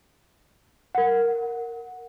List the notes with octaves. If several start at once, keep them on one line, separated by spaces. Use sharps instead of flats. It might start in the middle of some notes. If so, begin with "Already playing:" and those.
A#4 F#5